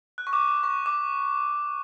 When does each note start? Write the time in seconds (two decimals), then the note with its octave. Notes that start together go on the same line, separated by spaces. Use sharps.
0.18 F#6
0.27 C#6
0.33 D6
0.48 D6
0.63 C#6
0.86 D6